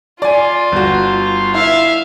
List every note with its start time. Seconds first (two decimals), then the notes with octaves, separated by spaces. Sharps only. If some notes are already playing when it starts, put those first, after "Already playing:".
0.22 F4 D5 G#5
0.72 G1 F#4
1.54 E4 E5 F5